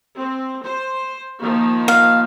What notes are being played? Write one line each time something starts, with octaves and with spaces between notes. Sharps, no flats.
C4
C5
D#3 F3 A#3
F5